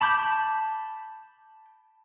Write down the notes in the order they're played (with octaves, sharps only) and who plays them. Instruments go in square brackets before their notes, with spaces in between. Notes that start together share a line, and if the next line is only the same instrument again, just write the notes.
[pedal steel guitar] A5 B5 D6 G6